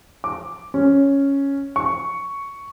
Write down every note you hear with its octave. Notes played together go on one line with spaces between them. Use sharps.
D6
C#4
C#6